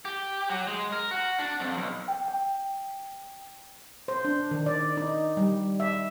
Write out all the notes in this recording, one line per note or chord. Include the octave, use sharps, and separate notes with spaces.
G4
F#3
G#3
A#4
F#4
D4
F2
B1
G5
G5
C5
D4
D#3
D5
D#4
G3
E5